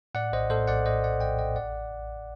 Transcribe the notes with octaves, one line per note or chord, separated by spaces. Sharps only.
A2 D5 F#5
A#1 C5 D#5
A2 A4 C5
A#1 D5 F#5
A2 C5 D#5
A2 D5 F#5
A#1 D#5 G5
A2 D#5 G5
A1 D5 F#5